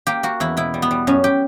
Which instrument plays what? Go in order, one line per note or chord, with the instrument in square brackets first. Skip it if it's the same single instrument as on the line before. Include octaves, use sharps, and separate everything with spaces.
[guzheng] A#3 G4
A#3 F#4
E2 E4
B2 E4
G3
B3
G3
F#2 C#4
G4